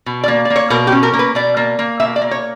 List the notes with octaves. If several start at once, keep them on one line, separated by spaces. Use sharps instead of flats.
B2
D5
A#3
D5
A#3
C#5
B2 A#4
G4
C#4
A#4
A#3
B4
B2 D5
A#3
A#3
B2 E5
D5
A#3
C#5